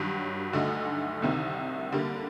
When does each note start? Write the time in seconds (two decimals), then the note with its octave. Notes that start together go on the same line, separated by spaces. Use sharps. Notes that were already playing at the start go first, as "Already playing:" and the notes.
Already playing: G2 D#3 F#3
0.53 D2 D3 A3 D#4 F#4
1.22 C2 C3 D#3
1.92 D3 G3 A#3